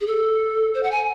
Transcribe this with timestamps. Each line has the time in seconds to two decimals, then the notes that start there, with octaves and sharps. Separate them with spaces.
0.01 G#4
0.07 A4
0.74 C5
0.83 F#5
0.92 G#5